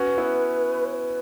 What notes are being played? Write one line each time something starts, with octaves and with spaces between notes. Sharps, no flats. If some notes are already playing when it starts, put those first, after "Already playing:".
Already playing: C#4 F#4 B4
B3 E4
C#5
B4